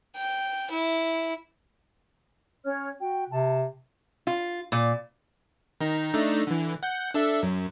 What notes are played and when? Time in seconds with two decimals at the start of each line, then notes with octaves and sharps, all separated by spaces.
0.16 G5
0.71 E4
2.64 C#4 C#5 F6
3.01 F#4 G5
3.30 C3 A5
4.27 F4
4.72 A#2
5.81 D#3 D#4
6.14 A3 D4 D#4
6.47 D3 E3
6.83 F#5 G6
7.14 D4 A4 E5
7.43 F#2